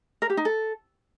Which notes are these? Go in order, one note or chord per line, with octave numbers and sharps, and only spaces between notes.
A#4
G4
D#4
A4